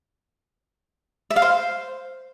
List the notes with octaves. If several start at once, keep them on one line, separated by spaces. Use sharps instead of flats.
E5
F5
C5